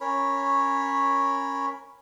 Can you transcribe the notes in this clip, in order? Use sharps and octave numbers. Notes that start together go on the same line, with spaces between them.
C#4 A#4 C#5 B5